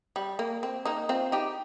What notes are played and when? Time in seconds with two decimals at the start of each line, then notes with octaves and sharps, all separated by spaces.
0.16 G3
0.39 A#3
0.63 C4
0.85 A#3 D#4
1.09 C4 F4
1.32 D#4 G4